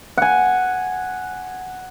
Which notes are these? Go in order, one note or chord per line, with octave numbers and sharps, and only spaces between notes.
F#5 G#5